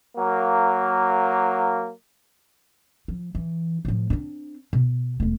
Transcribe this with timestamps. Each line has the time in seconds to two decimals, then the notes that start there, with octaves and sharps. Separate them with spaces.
0.17 F#3 A#3
3.08 F3
3.35 E3
3.85 A2 F3
4.10 C4 D4
4.73 B2
5.20 E1 A3